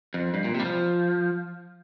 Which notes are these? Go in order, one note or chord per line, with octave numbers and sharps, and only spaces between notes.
F2
G2
A#2
C3
G3
F3